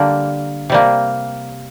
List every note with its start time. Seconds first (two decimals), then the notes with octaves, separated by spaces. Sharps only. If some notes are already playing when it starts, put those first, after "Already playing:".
Already playing: D3 G3 A#3 D5
0.70 C3 G3 A#3